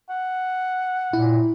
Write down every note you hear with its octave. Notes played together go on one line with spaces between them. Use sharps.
F#5
A#2 E4